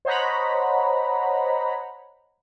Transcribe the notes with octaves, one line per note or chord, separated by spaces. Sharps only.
C5 C#5 D#5 F#5 A#5 B5